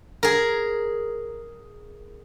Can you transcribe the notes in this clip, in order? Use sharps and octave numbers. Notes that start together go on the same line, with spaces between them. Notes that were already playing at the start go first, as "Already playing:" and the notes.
G#4 A#4